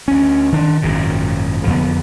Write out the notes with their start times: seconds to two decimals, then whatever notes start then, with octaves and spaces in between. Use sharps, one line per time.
0.08 D2 C#4
0.52 D#3 D4
0.82 G#1 F#2 A#2 C#3
1.67 F2 D3 B3